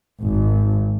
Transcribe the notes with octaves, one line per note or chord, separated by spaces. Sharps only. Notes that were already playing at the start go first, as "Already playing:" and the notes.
G#1